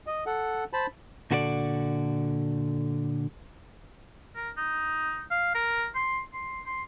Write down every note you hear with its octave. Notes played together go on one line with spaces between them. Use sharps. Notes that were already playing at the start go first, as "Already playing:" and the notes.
D#5
A4 F#5
C5 A5 B5
A#2 D3 F#4 A4 B4 D5
A#4
D#4
F5
A#4
C6
C6
C6